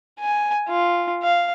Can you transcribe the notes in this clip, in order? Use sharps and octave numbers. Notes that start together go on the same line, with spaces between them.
G#5
F4
F5